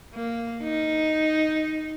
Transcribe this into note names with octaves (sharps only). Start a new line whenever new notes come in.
A#3
D#4